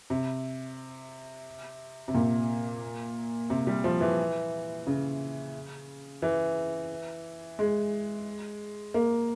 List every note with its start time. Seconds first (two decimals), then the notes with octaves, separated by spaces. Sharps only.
0.10 C3
2.08 C3
2.15 A#2
3.50 C3
3.67 G3
3.84 F3
4.01 E3
4.87 C#3
6.22 E3
7.59 G#3
8.94 A#3